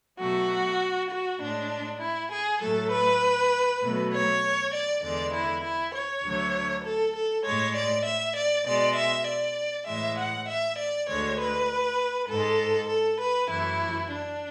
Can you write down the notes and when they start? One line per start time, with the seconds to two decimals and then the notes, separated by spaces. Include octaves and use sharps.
0.19 B2 F#3 A3 F#4
1.10 F#4
1.39 A2 G#3 D4
2.00 E4
2.31 G#4
2.61 A2 F#3 A3 A4
2.90 B4
3.82 B2 F#3 A3
4.12 C#5
4.73 D5
5.02 E2 D3 G#3 D5
5.33 E4
5.62 E4
5.93 C#5
6.23 D2 D3 F#3 A3
6.84 A4
7.14 A4
7.44 A2 G#3 C#5
7.74 D5
8.05 E5
8.35 D5
8.65 B2 G#3 D5
8.95 E5
9.26 D5
9.86 A2 E3 G#3 E5
10.17 F#5
10.47 E5
10.77 D5
11.07 D2 D3 G#3 C#5
11.38 B4
12.28 G#2 G#3 A4
12.89 A4
13.19 B4
13.49 F#2 E3 A3 E4
14.10 D4